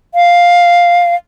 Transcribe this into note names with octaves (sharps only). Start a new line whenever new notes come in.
F5